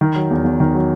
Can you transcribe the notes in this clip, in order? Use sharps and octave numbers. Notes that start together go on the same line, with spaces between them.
D#3
F#3
E2
E2
D#3
F#3